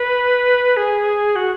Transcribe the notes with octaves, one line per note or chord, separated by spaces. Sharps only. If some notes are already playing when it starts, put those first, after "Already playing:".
Already playing: B4
G#4
F#4